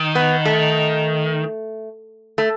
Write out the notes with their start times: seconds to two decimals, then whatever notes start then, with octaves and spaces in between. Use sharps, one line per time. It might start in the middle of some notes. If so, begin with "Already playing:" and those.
Already playing: D#3
0.15 B3
0.45 A3
2.38 A3